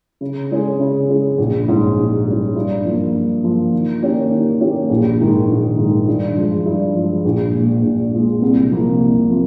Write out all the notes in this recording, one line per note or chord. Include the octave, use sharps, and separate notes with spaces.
C#3
G#3 C#4 G#4
C#3
G#3 C#4 G#4
A#1
G#2 G3 C#4
A#1
G#2 G3 C#4
G2
F3 A#3
G2
F3 A#3
D#3
A#3 C#4 G4
D#3
A#3 C#4 G4
A#1
G#2 D#3 G#3
A#1
G#2 D#3 G#3
G2
F3 G#3
G2
F3 G#3
A#1
A#2 G#3
A#1
A#2 G#3
C2
C3 F3 A#3
C2
C3 F3 A#3